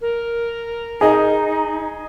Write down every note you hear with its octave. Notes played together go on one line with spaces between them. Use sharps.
A#4
D#4 G#4 D#5